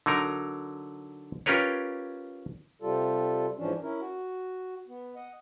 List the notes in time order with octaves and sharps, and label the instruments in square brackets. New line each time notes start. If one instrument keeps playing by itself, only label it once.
[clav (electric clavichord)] D3 F#3 D#4 A#4 A#5
C#4 F4 G4 A#4 B4 C#5
[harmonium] C3 G3 F4 A4
G#2 E3 F3 C#4 D4
C#4 E4 A#4
F#4
B3
D#5 F#5